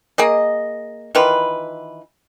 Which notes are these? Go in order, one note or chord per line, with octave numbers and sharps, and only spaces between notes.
A#3 G#4 D#5
D#3 E3 F4 B4